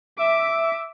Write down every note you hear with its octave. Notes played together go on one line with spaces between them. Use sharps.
E5 D6